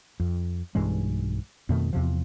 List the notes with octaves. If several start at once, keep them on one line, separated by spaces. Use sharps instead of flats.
F2
B1 G2 E3 G#3
F2 B2 D#3 A3
E2 C3 F3